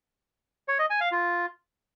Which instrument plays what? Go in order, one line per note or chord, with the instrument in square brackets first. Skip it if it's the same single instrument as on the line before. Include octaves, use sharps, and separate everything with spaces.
[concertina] C#5
D#5
G#5
F5
F4